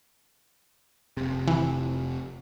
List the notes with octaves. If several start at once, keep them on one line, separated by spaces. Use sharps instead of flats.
F1 C3
E3